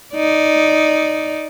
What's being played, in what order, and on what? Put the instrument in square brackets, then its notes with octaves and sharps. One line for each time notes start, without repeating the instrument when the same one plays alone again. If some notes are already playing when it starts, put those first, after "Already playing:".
[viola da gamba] D#4 D5